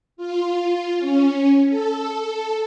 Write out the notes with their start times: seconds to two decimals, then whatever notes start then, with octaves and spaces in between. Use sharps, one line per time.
0.17 F4
0.98 C#4
1.69 A4